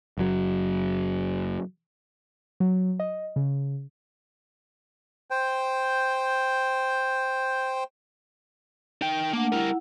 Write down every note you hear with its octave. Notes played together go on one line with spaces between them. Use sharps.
F#1 F#3
F#3
D#5
C#3
C5 G5
D#4 G5
A3 A#3 D4 F#5
G3 E4 A#4 F#5